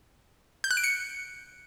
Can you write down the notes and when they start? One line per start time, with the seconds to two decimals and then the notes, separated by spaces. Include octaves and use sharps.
0.64 G6
0.71 F#6
0.77 D7
0.84 C#7